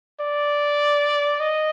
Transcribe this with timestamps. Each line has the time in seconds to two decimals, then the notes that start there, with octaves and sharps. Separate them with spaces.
0.20 D5
1.40 D#5